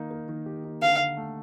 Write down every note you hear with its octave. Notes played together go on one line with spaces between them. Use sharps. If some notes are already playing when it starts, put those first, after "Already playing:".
Already playing: D#3 A#3 D#4
A#3
D#3
G4
D#4
D3 F5
D3
A3